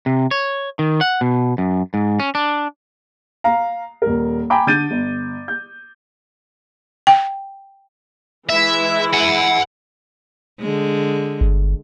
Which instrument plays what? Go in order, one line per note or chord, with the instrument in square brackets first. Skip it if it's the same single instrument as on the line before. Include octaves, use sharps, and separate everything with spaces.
[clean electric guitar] C3
C#5
D#3
F#5
B2
F#2
G#2
C#4
D4
[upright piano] F5 A#5
D#1 A#4
G5 G#5 A#5 B5 D6
D3 G6 A6 D#7
G1
G6
[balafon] G5
[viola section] E3 G#3 E4 [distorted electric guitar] E5
[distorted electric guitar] F#5 G#5
[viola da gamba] D3 G#3
[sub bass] G1